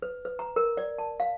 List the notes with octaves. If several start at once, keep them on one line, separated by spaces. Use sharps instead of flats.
B4
B4
A#5
A#4
D5
A5
F5